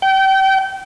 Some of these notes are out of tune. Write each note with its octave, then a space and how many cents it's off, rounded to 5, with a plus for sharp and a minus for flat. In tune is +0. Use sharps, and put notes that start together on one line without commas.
G5 -30